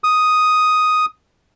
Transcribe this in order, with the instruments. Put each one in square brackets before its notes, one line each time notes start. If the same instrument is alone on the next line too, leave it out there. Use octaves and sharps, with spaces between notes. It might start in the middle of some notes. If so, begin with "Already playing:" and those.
[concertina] D#6